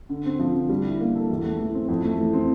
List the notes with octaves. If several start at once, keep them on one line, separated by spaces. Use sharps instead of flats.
D3
C4
F3
D3
G3
E4
A#3
A4
E2
A3
E3
C4
F2
A3
E3
C4